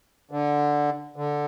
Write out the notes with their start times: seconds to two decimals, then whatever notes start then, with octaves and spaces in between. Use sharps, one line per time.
0.31 D3
1.16 D3